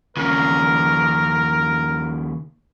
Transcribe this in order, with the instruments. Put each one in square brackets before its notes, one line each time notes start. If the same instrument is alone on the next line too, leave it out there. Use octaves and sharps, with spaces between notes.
[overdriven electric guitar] D#2 C#3 [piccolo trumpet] A#4